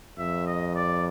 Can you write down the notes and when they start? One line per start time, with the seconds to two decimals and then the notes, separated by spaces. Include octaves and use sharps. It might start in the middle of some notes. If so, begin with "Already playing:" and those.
0.19 F2 E5
0.47 D#5
0.75 D5